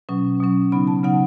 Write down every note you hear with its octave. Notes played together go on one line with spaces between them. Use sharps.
B2 F#3 C#4
B2 F#3 C#4
C#3 F#3 B3 D#4 B5
A5
C#3 F#3 B3 D#4 F#5